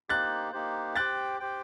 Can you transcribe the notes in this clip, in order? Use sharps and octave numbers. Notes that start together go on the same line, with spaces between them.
A#3 D#4 G4 C5 F#6 A6
A#3 D#4 G4 C5
G4 C5 G5 F#6 A6
G4 C5 G5